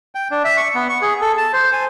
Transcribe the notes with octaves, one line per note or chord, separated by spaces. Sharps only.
G5
D4
E5
C#6
B3
C#6
G#4
A4
A5
C5
G#5